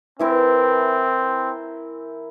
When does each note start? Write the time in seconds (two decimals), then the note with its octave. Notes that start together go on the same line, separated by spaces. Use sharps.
0.19 E3 C4 E4 A#4